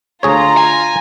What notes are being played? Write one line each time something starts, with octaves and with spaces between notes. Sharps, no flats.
D2 F4 G#4 C#5 A#5
G#5